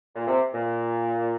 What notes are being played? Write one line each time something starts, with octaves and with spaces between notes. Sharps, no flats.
A#2
C3
A#2